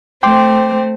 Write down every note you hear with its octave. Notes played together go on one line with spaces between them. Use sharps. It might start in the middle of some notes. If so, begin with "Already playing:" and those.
A3 C4 C5 G5 C6 D6